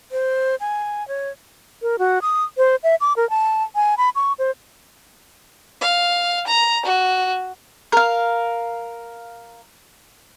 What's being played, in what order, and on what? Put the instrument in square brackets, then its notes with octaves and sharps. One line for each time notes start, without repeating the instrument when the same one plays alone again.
[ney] C5
G#5
C#5
[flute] A#4
F#4
D#6
C5
E5
D6
A#4
A5
G#5
B5
C#6
C5
[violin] F5
A#5
F#4
[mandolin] A#4 F5